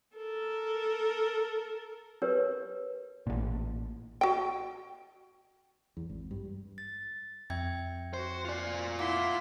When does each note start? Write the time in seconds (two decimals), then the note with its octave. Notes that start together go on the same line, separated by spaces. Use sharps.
0.17 A4 A#4
2.22 G4 A#4 B4 C#5
3.27 A1 A#2
4.21 F#4 G5
5.97 E2
6.09 G#1
6.31 G2
6.78 A6
7.50 F2 E5 G5 G#6
8.14 F#4 C5
8.45 F4 D5
8.99 E4 F5 F#5 C6 D6